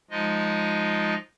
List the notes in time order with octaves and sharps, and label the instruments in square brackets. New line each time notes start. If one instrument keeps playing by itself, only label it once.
[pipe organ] F3 G#3 D#4 F4 D#5